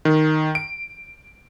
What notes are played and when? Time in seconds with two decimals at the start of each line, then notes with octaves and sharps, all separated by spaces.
0.05 D#3
0.55 D7